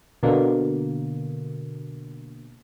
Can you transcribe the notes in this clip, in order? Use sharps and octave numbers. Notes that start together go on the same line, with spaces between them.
B2 D3 A#3